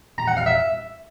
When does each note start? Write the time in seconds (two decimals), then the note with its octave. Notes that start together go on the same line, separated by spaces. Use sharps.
0.18 A#5
0.27 F#5
0.37 F5
0.46 E5